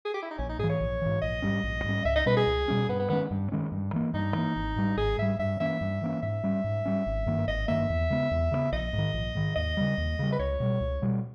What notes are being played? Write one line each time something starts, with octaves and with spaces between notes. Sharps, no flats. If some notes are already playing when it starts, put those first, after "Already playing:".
G#4
G4
E4
D#4
A#1 C#4
D#4
G#2 E3 G#4
C#5
A#1
G#2 E3
A#1 D#5
G#2 G3 C#4
A#1
G#2 G3 C#4
C#2 E5
D#5
B2 G3 C#4 B4
G#4
C#2
B2 G3 C#4
G2 B3
B3
D#3 G#3 B3 C#4
G2
D#3 G#3 C#4
G2
E3 A#3
G2 D#4
E3 A#3
G#1
G#2 G3
G#1 G#4
G#2 G3 E5
G2 E5
E3 A#3 C#4 E5
G2
E3 A#3 C#4
G#2 E5
G3 C#4
G#2
G3 C#4
G#1
G2 D#3 A#3
G#1 D#5
G2 D#3 A#3 E5
E2
C#3 G#3 B3
E2
C#3 G#3 B3
A#1 D#5
G#2
D#3
A#1
G#2 D#3
D#2 D#5
C#3 G3
D#2
C#3 G3
B4
C#2 C#5
B2 G3
C#2
B2 G3